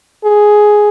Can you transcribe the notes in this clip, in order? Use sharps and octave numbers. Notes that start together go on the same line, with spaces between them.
G#4